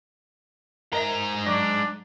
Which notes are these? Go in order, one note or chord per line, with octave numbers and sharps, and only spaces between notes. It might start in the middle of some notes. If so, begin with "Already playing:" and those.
G#2 A#4 D#5 E5 A#5
F#3 D4